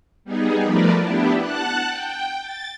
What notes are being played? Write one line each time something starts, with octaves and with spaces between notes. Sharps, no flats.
G3 B3 D#4 G#4
F3 A3 A#4 B4 D5
B3 D4 E4 G4
F#5 A5 F#6
G5
A6